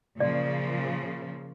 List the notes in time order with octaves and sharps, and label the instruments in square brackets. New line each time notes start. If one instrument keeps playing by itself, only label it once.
[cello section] A#2 C#3 F3 [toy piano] D5